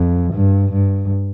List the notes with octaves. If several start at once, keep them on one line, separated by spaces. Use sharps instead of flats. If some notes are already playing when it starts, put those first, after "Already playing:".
Already playing: F2
G2
G2